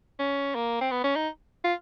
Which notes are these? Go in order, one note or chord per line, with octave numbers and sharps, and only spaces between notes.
C#4
A#3
C4
B3
C#4
D#4
F4